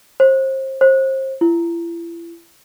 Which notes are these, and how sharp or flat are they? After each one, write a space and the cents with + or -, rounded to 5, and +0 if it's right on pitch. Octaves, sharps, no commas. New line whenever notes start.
C5 +30
C5 +30
E4 +40